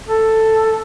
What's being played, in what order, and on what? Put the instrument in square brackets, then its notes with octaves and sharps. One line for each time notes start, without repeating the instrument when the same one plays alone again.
[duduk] A4